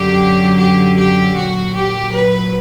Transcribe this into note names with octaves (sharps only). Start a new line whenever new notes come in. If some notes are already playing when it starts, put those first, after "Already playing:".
Already playing: F#2 D3 F#3 G4
G4
G4
A#2 F#3 F#4
G4
B4